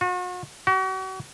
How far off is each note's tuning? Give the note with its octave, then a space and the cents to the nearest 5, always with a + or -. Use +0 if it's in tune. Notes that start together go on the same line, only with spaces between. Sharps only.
F#4 -40
F#4 +40